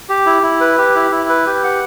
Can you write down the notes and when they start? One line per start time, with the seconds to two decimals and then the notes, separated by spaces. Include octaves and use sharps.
0.09 G4
0.26 E4
0.43 E4
0.61 B4
0.78 G4
0.95 E4
1.11 E4
1.29 B4
1.46 G4
1.64 F#5